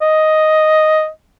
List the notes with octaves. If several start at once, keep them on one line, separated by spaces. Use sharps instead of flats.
D#5